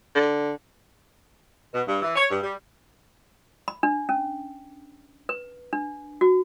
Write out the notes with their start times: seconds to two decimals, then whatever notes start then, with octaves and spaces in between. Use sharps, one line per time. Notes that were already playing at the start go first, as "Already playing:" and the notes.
0.15 D3
1.74 B2
1.86 G2
2.02 E3
2.15 C#5
2.30 G2
2.43 G3
3.68 B5
3.83 D4
4.09 C#4
5.29 B4
5.73 D4
6.21 F#4